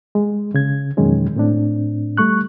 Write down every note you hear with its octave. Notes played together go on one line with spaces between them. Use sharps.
G#3
C#3 G#6
F2 B2 D#3 F#3 G#3 C#4
A2 C4 D4
G3 A3 C#6 F#6